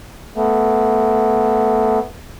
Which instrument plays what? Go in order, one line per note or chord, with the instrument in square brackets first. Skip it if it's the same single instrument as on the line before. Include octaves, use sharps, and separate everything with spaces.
[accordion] A3 B3